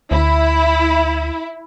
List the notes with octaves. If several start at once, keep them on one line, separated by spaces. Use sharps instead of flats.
D2 E4